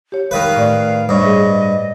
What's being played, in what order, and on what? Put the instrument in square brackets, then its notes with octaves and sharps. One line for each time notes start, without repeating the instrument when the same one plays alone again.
[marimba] G4 C#5
[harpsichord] D#3 B4 [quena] F5
[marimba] A2 A3 D5
[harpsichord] G2 [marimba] C5 C#5 C#6 [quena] D#5
[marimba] G#4 B4 E5